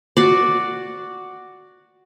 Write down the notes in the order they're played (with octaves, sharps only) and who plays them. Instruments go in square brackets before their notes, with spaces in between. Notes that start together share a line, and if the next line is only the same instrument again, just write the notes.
[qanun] F#4 D5